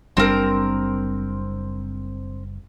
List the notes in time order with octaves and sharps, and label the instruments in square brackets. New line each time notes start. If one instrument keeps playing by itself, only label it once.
[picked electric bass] F#1 G3 D4 [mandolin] C4 A#4